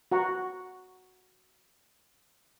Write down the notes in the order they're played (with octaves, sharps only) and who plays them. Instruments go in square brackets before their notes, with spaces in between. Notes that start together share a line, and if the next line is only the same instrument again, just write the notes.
[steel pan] F#4 F#5 A#5 C#6